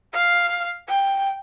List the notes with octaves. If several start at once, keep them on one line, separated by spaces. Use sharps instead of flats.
F5
G5